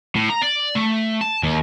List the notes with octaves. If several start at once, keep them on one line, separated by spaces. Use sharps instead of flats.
A2
A#5
D5
A3
A5
D#2